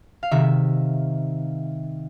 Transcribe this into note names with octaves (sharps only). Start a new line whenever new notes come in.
F5
C3 D#3 E5